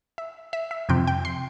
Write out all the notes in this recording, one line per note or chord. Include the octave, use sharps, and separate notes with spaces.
E5
E5
E5
F2 C3 F3 C4 G5
G5
C6